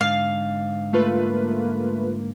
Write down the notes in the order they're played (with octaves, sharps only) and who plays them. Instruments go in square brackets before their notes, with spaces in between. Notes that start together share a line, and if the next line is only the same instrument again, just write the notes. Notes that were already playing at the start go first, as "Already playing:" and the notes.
[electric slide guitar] G#2 D3 [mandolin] F5
[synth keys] A3 F4 B4 [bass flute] A#3